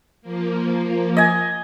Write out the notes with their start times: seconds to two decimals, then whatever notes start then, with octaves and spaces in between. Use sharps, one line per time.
0.22 F3 A#3
1.17 D#5 G#5